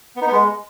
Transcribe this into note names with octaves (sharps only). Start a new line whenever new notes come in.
B3
D#4
B3
G#3